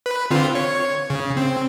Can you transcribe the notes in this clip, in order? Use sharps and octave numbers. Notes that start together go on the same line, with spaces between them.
B4
D3 C4 F4
C#5
C#3
C4